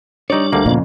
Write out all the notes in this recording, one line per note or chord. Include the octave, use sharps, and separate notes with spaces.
G3 D4 D#4 C#5 D5
D2 D3 G3 A#3
F2 A#2 C#3